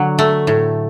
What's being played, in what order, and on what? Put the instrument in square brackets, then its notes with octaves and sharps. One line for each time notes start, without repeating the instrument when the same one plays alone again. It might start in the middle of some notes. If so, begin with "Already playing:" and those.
Already playing: [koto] D3 F#3
A3
A2